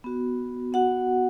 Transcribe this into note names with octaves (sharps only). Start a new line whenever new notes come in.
B3 F#4
B3 F#4 F#5